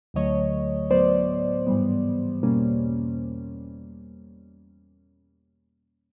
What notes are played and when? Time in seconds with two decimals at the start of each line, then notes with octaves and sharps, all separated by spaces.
0.14 D2 D3 F#3 A3 C#5 D#5
0.90 A2 F#3 B3 C5 D5
1.67 G#2 E3 G3 B3
2.43 E2 B2 G3 A#3 C#4